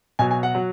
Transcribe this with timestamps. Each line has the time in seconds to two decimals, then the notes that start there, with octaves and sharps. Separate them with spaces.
0.19 B2 F#3 G#5
0.31 G#5
0.43 F#5
0.55 F#3